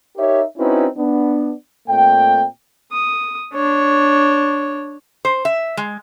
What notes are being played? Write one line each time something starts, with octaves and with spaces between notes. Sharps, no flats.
D#4 G4 A#4 C#5 E5
C4 C#4 D#4 E4 F#4 B4
B3 D4
A#2 A3 C4 G5
D#6
D4 C#5
C5
E5
G#3